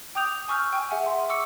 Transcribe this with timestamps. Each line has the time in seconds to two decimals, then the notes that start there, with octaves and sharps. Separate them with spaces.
0.15 G5 D6 D#6 G6 F7
0.48 G#5 C#6 E6 F6 G6
0.73 G5 G#5
0.91 G#4 E5 F#5 G#5
1.06 C6
1.29 C#6 D6 E6 C#7